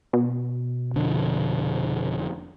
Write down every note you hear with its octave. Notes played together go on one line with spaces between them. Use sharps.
B2
F1 D3 F3